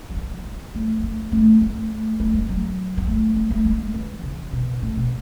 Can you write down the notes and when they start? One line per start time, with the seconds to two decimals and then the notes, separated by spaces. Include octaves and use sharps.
0.10 F#3
0.16 E3
0.31 F#3
0.45 G#3
0.75 A3
0.99 G#3
1.03 A3
1.32 A3
1.61 A3
2.20 A3
2.34 G#3
2.49 F#3
2.97 B3
3.07 A3
3.36 A3
3.51 A3
3.65 G#3
3.94 E3
4.23 C#3
4.53 B2
4.82 A2
4.97 B2